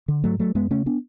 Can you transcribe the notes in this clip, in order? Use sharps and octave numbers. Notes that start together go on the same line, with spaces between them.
D3
G#2 F#3 A3
F#3 A3
F#2 G#3 B3
C#3 A3 C#4
B3 D4